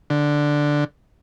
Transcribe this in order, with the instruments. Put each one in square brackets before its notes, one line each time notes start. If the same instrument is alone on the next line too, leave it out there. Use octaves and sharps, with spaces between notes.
[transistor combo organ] D3